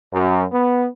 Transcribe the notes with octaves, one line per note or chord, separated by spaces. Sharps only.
F#2
B3